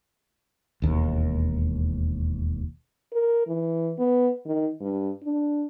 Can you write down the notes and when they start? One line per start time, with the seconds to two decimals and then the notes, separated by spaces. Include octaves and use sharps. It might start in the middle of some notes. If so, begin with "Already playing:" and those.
0.82 E1 D#2
3.12 A#4
3.47 E3
3.98 B3
4.46 D#3
4.81 G2
5.23 D4